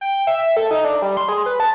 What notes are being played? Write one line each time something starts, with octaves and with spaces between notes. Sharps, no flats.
G5
E5
A4
D#4
D4
G3
C6
G#4
B4
A5